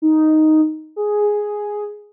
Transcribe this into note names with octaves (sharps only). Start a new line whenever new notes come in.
D#4
G#4